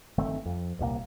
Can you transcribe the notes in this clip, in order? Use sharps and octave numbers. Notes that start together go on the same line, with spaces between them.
G1 D#3 A3 C4
F2
D#1 C2 D3 A#3